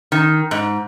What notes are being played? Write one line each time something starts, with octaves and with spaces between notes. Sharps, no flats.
D#3
G#2